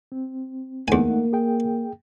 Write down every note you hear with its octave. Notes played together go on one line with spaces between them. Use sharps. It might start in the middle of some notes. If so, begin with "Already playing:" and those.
C4
E2 A3 A#3 D#4 F#5 G#5
G#4 G5